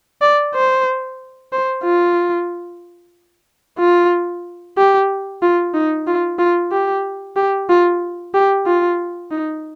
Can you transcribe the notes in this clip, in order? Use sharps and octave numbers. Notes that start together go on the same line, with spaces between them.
D5
C5
C5
F4
F4
G4
F4
D#4
F4
F4
G4
G4
F4
G4
F4
D#4